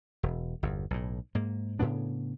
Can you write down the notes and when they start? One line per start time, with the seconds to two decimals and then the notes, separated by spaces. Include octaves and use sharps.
0.23 E1
0.63 G1 E2
0.91 B1 A2
1.35 G#2 A#3
1.79 A2 C#3 B3 D4